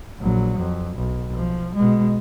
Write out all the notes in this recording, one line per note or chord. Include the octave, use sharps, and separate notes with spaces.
A#1 F#3
F2
B1
F3
B2 G#3